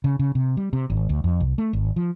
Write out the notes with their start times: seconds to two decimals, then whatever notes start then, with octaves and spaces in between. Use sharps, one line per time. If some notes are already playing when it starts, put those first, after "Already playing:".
0.04 C#3
0.19 C#3
0.35 C3
0.57 G3
0.73 C3
0.90 G#1
1.09 D2
1.24 F2
1.40 C2
1.58 A3
1.73 G#1
1.96 F3